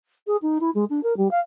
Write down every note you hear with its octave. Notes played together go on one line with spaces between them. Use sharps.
G#4
D#4
E4
G#3
D4
A#4
G3
F5